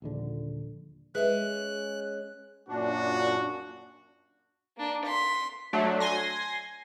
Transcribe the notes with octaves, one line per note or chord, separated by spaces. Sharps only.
D#1 A#1 D3
G#3 C#4 B4 E5 F#6
F#2 A#2 D4 F#4
A#3 D4
C6 B6
F#3 A3 D4
G#5 C6 A#6